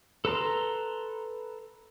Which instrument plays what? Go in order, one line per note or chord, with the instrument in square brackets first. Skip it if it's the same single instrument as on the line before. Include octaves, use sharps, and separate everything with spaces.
[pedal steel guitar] A4 B4 A#5 C6